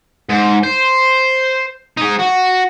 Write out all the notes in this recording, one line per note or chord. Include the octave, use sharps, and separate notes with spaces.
G#2
C5
D#4 G#4
F#4